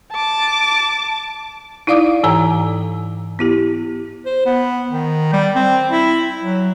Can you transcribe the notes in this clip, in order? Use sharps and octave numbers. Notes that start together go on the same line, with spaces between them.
A5 D6
D#4 E4 D5 F5 D6 D#6
G#2 E3 A4 C#5 G5 A#5
B3 E4 G4
C5
B3
D#3
G3
C4
E4
F#3